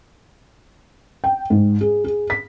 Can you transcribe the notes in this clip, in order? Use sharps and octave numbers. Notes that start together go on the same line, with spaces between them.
G5
G#2
G#4
G#4
B6